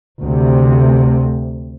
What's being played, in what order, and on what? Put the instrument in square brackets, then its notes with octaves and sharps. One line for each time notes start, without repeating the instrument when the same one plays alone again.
[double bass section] D2 C3